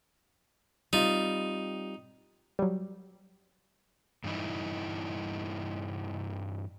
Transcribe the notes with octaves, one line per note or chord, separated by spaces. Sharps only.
G3 C4 D#4 F4
F#3 G3
G2 E3 D#4 E4